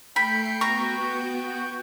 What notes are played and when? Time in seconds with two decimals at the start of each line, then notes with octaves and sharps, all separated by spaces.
0.16 A3 G5 B5 G6 C7 C#7
0.61 B3 F#4 A#5 C#6